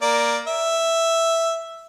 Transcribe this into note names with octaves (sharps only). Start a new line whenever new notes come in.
A#3 D5 A#5
E5